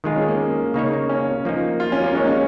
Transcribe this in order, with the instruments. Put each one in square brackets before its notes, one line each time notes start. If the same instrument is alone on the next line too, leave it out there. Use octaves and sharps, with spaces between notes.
[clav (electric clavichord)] D#3 G#3 F4 G#4 [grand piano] D#4
[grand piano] C#4
A#3
[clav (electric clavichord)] C#3 A#3 D#4 C#5
[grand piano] C#4
[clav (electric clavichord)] F3 A#3 D#4
[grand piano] F4
C#4
A#3
[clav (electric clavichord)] G#3 D#4 C#5 [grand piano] C#4
[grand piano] C#4